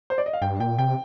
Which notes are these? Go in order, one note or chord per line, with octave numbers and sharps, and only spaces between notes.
C5
D5
D#5
F5
G2 G5
A#2 G5
C3 G5